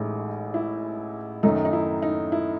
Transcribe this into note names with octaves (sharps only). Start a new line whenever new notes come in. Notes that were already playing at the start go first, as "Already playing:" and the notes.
Already playing: A1 A2 G#3 D#4
E4
F#2 D#3 F#3 A3 D#4
D#4
E4
D#4
E4